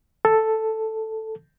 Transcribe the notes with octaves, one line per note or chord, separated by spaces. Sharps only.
A4